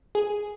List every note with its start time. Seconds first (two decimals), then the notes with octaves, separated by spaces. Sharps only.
0.15 G#4